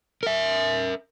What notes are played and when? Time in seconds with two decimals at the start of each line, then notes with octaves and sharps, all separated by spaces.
0.23 A#4 E5